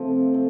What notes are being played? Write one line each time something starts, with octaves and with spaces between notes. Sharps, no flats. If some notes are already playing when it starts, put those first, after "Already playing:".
Already playing: C3 F3 A3 C4
F3 A3